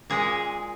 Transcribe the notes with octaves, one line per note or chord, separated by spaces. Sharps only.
A#2 G#3 G#4